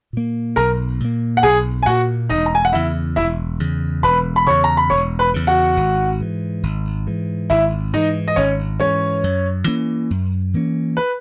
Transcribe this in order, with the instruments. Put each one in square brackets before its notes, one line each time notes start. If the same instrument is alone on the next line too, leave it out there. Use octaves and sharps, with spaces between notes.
[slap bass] A#2 A#3
[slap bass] B1 [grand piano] A#4 A#5
[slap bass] A#2 A#3
[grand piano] F#5
[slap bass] B1 [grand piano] G#4 G#5
[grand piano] G#5
[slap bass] A#2 A#3 [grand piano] F#4 F#5
[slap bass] E1 [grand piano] D#4 D#5
[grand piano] A#5
G#5
F#5
[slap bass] E2 C#3 [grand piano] E4 E5
[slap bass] E1 [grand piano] E4 E5
[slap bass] E2 C#3
[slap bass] E1 [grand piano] B4 B5
[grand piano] B5
[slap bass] E2 C#3 [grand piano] C#5 C#6
[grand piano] A#5
B5
[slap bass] E1 [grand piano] C#5 C#6
[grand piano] B4 B5
[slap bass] E2 C#3
[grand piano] F#4 F#5
[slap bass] G#1
G#2 E3
G#1
G#2 E3
[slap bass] G#1 [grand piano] E4 E5
[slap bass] G#2 E3 [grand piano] D#4 D#5
[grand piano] D#5
[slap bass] G#1 [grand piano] C#4 C#5
[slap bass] G#2 E3 [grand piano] C#4 C#5
[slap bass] F#2
E3 A#3 C#4
F#2
E3 A#3 C#4
[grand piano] B4